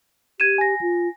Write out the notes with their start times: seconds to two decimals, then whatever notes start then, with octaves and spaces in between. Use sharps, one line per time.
0.40 G4 G#6 D#7 E7
0.58 G#5 A#6
0.81 F4